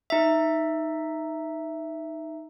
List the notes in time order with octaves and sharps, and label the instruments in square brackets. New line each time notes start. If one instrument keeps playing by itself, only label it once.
[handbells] D#4 E5